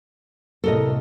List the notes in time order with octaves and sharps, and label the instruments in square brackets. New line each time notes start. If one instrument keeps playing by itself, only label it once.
[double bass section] C2 A2 [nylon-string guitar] A4 A#4 D#5